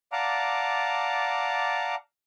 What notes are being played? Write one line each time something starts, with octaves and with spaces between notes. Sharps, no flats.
D5 F5 F#5 A5 A#5 D6